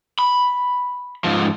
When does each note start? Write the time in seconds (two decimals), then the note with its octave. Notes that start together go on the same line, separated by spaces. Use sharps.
0.19 B5
1.24 G#2 F3